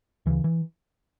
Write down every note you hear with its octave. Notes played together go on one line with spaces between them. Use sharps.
D2 C#3 E3
E3